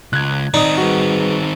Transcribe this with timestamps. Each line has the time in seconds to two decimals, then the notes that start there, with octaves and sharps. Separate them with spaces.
0.13 C#2 F#6 G#6
0.54 D#3 C4 D#4 D5 D#6
0.78 G3 F#4 G#4 B4